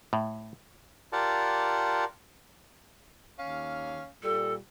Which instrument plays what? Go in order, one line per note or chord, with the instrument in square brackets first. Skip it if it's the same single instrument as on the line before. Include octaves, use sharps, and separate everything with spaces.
[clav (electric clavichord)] A2
[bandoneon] F4 G4 A#4 D5 F#5 A5
[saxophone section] D#2 C#4 F5
[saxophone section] A#2 G3 [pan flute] A4